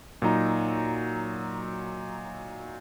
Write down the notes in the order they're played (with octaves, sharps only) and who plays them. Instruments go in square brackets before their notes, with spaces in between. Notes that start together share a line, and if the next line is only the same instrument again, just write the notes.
[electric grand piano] A#2 F#3 D#4 A#5